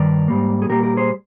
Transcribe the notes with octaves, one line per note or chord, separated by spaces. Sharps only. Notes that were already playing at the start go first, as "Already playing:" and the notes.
Already playing: G2 D#3 A#4 D5
G#2 G3 A#3
G#4
A#2 G3 A#3 G4 A#4
G4 A#4
G#4 C5